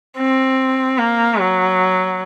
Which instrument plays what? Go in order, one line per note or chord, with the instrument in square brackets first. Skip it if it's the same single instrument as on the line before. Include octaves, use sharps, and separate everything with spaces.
[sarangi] C4
A#3
F#3